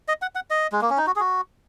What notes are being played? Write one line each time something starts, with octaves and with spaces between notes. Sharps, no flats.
D#5
F#5
F#5
D#5
G#3
A#3
C#4
D#4
F#4
G#4
F#4